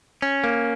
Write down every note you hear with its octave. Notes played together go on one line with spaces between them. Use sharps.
C#4
A#3